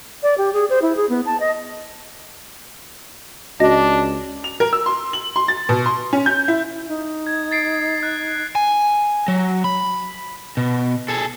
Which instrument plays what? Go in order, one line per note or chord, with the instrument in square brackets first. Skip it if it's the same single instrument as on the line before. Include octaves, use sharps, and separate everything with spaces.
[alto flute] D5
G4
G#4
C5
E4
G#4
B3
A5
D#5
[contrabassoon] C#2 [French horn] D4 [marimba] F#4 D#5 A#6
[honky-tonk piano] F7
A#4
E6
C6
F#7
C6
A6
B2
C6
C#4
G6
E4
[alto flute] D#4
[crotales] G#6
A6 C7 D7
F#6
[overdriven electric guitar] G#5
F#3
B5
B2
G#4 A4